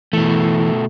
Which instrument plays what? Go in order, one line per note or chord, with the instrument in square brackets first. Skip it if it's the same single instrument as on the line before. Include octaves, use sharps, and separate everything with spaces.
[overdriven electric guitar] B2 A3 [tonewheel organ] E3